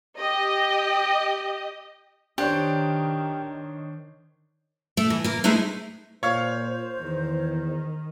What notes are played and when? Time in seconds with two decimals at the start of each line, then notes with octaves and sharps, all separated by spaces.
0.17 G4 D#5
2.38 D#3 D4 G4 C5 C#5
4.97 A3
5.10 E3
5.24 A#3 A#4
5.44 G#3 A3 D#4 E4 G#4 B4
6.23 A#2 C5 C#5 F5
7.01 E2 D#3